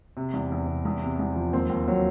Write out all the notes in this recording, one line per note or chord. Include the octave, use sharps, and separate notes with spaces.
C3
E2
E2
C3
E2
C3
E2
F3
D#2 C4
D#2
F#3